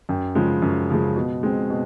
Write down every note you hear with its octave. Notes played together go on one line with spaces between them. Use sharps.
F#2 G5
C#3 F3 G#3
F#2
C#3 F3 G#3
B2
G#3 C4
B2